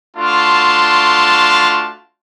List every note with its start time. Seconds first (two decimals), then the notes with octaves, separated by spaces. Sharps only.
0.17 A3 D4 F4 F#4 A5 C6